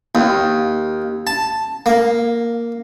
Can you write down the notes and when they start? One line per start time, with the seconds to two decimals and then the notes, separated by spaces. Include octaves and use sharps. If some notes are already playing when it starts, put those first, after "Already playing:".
0.15 D#2
1.27 A5
1.86 A#3